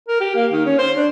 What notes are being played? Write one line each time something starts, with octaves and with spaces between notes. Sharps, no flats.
A#4
G4
A#3
D#3
C#4
C5
D4